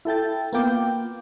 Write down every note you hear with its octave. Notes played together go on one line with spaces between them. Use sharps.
E4 A4 G5 A6
A#3 B3 F4 G5 D6